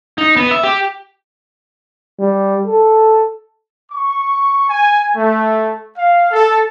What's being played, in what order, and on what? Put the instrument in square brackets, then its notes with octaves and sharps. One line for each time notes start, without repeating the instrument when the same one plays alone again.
[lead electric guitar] D#4
B3
E5
G4
[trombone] G3
A4
[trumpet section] C#6
G#5
A3
F5
A4